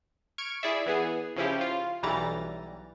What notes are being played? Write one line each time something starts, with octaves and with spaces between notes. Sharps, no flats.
C#6 F6 G#6 D7
E4 G#4 D5 E5
E3 B3 G#4
C#3 F3 C#4 E4 G4
F4
B1 E3 G3 A#5 A6